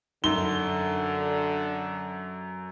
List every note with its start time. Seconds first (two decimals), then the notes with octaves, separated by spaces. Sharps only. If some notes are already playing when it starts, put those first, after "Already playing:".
0.24 F#2 D3 D#4 G7